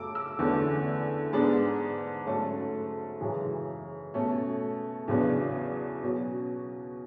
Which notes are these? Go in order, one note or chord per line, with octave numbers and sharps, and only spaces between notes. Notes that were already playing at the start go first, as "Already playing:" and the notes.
Already playing: F#2 C#3 F#3 A3 D6 E6
E6
E2 D3 A3 C#4
G#2 G#3 B3 D4 A5
G#2 F#3 A3 C#4 A5
F#2 C#3 E3 G#3
B2 A3 C#4
E2 C#3 F#3 B3 D4
B2 F#3 C#4